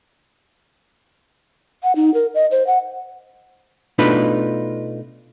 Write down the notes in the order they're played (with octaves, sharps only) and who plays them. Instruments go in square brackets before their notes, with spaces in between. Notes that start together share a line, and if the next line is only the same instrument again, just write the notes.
[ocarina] F#5
D#4
A#4
D#5
C5
F#5
[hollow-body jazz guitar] B2 A3 D4 D#4 F4 B4